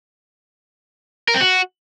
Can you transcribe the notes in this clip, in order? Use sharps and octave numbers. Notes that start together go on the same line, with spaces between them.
A#4
C4
F#4